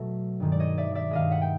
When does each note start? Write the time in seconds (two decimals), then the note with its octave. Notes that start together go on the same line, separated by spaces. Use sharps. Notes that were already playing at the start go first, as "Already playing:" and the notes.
Already playing: B2 F#3 A3
0.40 G2 D#3 G#3
0.52 D5
0.60 C#5 D#5
0.78 D5 E5
0.95 D5 E5
1.11 G2 D#3 G#3 D#5 F5
1.31 E5 F#5
1.42 G5